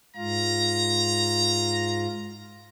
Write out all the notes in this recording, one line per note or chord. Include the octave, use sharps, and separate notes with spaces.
G#2 F4 A#5